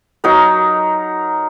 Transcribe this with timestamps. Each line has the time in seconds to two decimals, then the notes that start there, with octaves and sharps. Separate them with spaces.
0.24 F#3 D#4 A#4